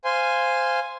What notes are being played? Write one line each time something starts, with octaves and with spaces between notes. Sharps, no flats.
C5 F5 G#5 C6